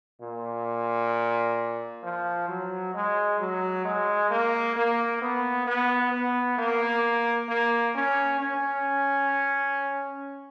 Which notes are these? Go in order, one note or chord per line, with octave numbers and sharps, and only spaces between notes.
A#2
F3
F#3
G#3
F#3
G#3
A#3
A#3
B3
B3
B3
A#3
A#3
C#4
C#4